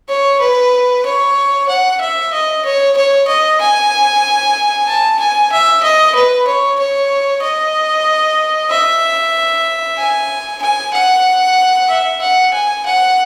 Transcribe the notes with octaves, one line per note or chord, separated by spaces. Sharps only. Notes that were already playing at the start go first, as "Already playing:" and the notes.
C#5
B4
C#5
F#5
E5
D#5
C#5
C#5
D#5
G#5
A5
G#5
E5
D#5
B4
C#5
C#5
D#5
E5
G#5
G#5
F#5
E5
F#5
G#5
F#5